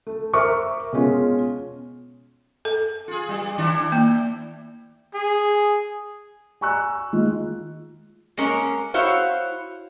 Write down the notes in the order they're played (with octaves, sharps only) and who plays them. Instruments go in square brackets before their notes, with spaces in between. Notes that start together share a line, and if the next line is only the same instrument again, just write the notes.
[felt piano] A3
A#4 C5 E5 C#6 D6 F6
B2 G#3 C#4 F4
[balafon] A4
[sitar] F4 G#4
G2 G3
D#3 D4 E4
[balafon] A#3
[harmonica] G#4
[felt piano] G#5 A#5 C#6 E6 F#6
D#3 G#3 F4
[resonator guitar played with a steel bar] G#3 A#3 C#4 A#4
E4 F#4 C5 C#5 F5